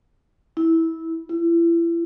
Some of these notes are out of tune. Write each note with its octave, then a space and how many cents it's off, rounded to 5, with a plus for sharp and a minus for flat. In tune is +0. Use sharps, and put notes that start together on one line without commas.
E4 -15
E4 +35